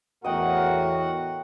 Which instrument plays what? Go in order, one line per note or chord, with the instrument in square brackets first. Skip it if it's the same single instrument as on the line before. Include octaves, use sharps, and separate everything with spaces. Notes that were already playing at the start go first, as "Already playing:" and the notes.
[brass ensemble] E2 A2 A#4 [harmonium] F#4 F#5 [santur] D#5 G5